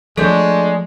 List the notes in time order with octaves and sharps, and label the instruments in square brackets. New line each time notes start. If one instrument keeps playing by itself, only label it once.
[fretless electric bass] F3 A3 [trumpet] G#3 [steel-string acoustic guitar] D4 C#5 D5 [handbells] A4 G6